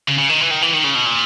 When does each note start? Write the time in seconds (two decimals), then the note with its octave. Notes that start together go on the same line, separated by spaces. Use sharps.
0.08 C#3
0.18 C#3
0.29 D#3
0.41 E3
0.51 D#3
0.62 E3
0.74 D#3
0.84 C#3
0.95 B2
1.06 A#2